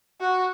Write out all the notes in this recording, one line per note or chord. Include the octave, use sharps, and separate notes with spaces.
F#4